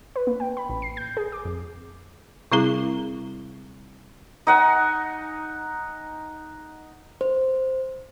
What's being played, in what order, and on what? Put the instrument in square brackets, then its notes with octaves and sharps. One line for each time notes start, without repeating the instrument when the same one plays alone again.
[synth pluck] B4
A#3
G5
B5
A1
C7
G6
G#4
D6
F2
[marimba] C3 G3 C4 E4 G#4
[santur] D#4 F#5 G#5
[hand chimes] C5